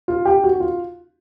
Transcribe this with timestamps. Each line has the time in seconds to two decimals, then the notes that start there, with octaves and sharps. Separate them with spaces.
0.08 F4
0.25 G4
0.44 F#4
0.60 F4